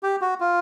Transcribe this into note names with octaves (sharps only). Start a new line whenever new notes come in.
G4
F#4
F4